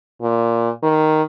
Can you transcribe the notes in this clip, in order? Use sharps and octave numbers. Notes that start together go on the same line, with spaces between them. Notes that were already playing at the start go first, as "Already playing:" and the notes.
A#2
D#3